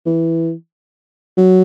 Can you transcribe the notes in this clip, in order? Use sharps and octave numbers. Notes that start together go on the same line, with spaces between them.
E3
F#3